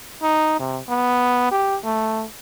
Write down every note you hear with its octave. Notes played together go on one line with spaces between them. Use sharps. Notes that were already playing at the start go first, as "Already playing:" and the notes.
D#4
C3
B3
G4
A3